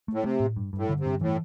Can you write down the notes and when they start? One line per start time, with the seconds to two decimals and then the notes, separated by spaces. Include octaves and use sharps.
0.08 A3
0.13 A2
0.24 C3 A3
0.40 A2
0.56 G2
0.73 G2
0.78 A2
0.89 D3
1.00 C3
1.06 G2
1.21 A2 E3